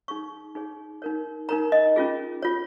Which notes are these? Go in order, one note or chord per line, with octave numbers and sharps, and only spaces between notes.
D#4 G#4 C#5 C#6
D#4 G#4 C#5
D#4 A#4 C#5
D#4 A#4 C#5 A#5
D#5
C#4 F4 G#4
F4 C#5